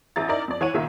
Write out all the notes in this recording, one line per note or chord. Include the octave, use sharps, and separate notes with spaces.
A1 E3 E4 A#5 A6
D#4 E4 A#4 D5
F2 D5
E3 C#5 F#5 D#7
C#2 A#2 D#3 E5